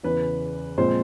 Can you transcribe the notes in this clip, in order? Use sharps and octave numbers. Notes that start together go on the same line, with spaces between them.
E2 C#3 E3 B4
A#2 F3 G#3 C4 C5